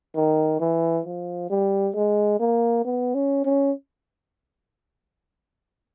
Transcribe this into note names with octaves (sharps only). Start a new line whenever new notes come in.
D#3
E3
F3
G3
G#3
A#3
B3
C#4
C#4